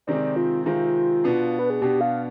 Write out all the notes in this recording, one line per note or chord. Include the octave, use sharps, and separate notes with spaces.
C3 D#3 G#3 C4 D5
F4
C3 D#3 G#3 C4 F4
B2 B3 D4
B4
G#4
B2 B3 D4 G4
F5